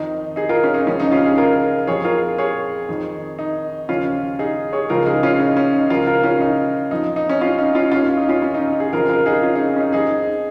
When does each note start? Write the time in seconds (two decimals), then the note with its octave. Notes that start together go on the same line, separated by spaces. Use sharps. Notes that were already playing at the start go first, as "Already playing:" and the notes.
Already playing: F2 D#3 D#4
0.36 D#4 G#4
0.49 F4 A#4
0.64 C#4
0.74 D#4
0.87 C#2 C#3 F3 C#4
1.00 D#4
1.12 C#4 F4
1.25 D#4 G#4
1.37 F4 A#4
1.87 F2 F3 G#4 C#5
2.05 F4 A#4
2.38 G#4 C#5
2.89 F2 D#3
3.39 D#4
3.89 D#2 C#3 F3 C#4 F4
4.39 D#4 G#4
4.73 G#4 C#5
4.90 C#2 C#3 F3 F4 A#4
5.06 D#4 G#4
5.23 C#4 F4
5.40 D#4
5.57 C#4
5.73 D#4
5.90 C#2 C#3 F3 F4 A#4
6.07 F4 A#4
6.24 C#4 F4
6.41 D#4
6.91 F2 F3 D#4
7.16 D#4
7.29 C#4
7.41 C#4 F4
7.58 D#4
7.75 C#4 F4
7.92 D#2 D#3 C#4 F4
8.17 D#4
8.29 C#4 F4
8.42 C#4
8.54 D#4
8.67 D#4
8.80 D#4 G#4
8.93 F2 C#3 F3 F4 A#4
9.09 F4 A#4
9.26 D#4 G#4
9.42 C#4 F4
9.55 D#4
9.68 D#4
9.76 C#4
9.80 D#4
9.93 F2 F3 D#4 G#4